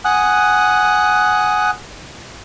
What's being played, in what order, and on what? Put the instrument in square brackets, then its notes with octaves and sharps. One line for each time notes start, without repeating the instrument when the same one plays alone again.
[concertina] F#5 G#5 D#6 F#6